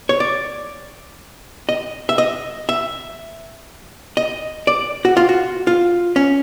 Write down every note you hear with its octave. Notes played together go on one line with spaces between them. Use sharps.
C#5
D5
D#5
E5
D#5
E5
D#5
D5
F#4
F4
F#4
F4
C#4